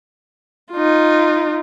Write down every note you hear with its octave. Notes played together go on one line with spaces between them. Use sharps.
D#4 F4